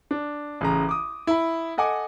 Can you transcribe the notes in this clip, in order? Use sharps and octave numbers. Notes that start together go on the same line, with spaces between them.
D4
A1 C#3 A#5
D6 D#6
E4 B5
A4 D#5 F#5 G#5 D6